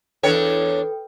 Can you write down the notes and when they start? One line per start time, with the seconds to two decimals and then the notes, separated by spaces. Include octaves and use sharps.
0.23 E2 D4 A4 B4 C#5 G5